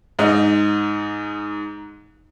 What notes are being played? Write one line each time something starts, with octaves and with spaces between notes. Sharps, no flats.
G#2 D#4